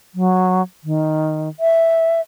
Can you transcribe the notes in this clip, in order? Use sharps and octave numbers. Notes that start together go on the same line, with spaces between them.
F#3
D#3
E5